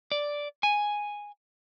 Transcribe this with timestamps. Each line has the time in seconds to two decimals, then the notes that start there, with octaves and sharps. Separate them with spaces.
0.12 D5
0.63 G#5